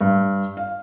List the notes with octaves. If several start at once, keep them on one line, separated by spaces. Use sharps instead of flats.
G2
F5